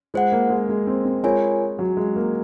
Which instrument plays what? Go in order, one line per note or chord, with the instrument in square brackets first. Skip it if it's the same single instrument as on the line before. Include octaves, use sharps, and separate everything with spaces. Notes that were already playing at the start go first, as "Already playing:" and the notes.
[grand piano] G#3 [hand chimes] F4 C5 F#5
[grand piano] A#3
G#3
G#3
C4
C4
[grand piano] G#3 [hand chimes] F4 A#4 C#5 G#5
[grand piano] F#3
G#3
A#3